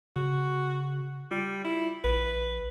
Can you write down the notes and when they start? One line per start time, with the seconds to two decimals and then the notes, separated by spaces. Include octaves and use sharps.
0.16 C#3 F#4
1.31 G3 F4
1.65 E4
2.04 A#1 B4